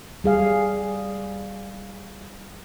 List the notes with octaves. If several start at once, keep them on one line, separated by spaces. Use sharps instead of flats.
G3 G#4 F5